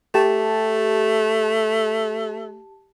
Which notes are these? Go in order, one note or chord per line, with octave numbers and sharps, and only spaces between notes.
A3 G4 A5